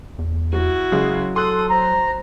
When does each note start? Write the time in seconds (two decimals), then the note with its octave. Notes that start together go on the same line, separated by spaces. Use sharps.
0.19 E2
0.53 F#3 E4 F#4
0.92 C#3 F#3 G#3 G#4
1.36 A4 C6 D#6 F#6
1.70 C5 A#5